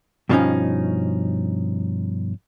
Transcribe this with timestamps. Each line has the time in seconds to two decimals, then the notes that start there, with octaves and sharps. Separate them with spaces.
0.29 G2 B2 F3 A#3 C#4 D#4